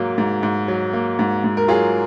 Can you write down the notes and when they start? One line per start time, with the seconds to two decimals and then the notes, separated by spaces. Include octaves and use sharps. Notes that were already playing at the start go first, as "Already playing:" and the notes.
Already playing: G#2 F#3 A#3
0.18 G#2
0.43 G#2
0.68 F#3
0.93 A#3
1.19 G#2
1.44 G#2
1.57 A#4
1.68 F#3 F4 G#4